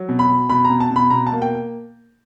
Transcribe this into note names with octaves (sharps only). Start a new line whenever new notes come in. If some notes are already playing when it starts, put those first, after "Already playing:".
Already playing: F#3
B2
B5
B2
B2 B5
B2 A#5
A5
B2
B5
B2 A#5
A5
A#3
G5